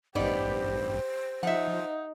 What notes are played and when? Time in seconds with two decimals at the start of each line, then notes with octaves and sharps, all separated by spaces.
0.15 A1 G2 B3 D#4 G4 C5 D5
1.43 F3 D#4 E5 F#5